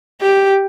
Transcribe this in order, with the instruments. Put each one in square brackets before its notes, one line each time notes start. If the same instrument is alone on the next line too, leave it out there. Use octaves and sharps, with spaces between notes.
[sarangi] G4